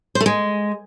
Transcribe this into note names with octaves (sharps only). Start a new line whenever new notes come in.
C5
A3
G#3